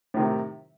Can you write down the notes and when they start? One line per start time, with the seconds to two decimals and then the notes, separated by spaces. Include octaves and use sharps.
0.14 A2
0.17 D#3
0.19 C3